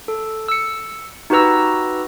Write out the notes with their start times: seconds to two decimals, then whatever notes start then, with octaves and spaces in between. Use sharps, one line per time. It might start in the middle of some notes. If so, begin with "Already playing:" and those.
0.08 A4
0.48 E6 C#7
1.30 D#4 F#4 G4 B4 A#5 E6